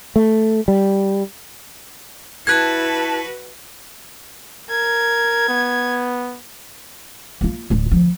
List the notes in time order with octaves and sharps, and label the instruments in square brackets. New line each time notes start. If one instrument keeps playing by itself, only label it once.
[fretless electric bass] A3
G3
[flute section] E4 A5 [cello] F#4 B4 [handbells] F#6 G#6
[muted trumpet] A#4 [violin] G#6
[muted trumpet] B3
[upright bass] A#3 F4
D1 D2
D2 F3